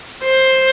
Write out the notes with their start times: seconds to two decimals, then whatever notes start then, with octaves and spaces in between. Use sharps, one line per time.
0.24 C5